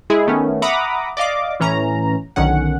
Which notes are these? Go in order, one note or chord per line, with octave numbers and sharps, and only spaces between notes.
G#3 E4 G#4
D#3 A3 B3 C#4
E5 F#5 A#5 B5 D6 D#6
D5 D#5 F5 D6
A2 E3 C#4 A#5
B1 D3 D#3 C#4 F#5